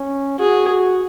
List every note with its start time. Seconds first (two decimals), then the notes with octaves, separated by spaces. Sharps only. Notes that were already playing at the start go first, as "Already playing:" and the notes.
Already playing: C#4
0.39 F#4 G#4